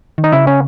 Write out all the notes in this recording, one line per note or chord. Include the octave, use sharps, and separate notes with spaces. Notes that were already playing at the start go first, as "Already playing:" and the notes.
D#3
D#4
C#3 E4
C#4